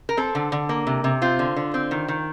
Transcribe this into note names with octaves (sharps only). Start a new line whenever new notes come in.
A#4
C4 A4
D3
D3
A#3
C3
C3
C4 F4
D3
D3
C4
D#3
D#3